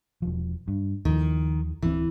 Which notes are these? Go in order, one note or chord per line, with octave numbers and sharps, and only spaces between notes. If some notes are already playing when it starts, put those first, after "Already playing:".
E1 F3
G2
D#2 D#3 F3
D1 E3 C4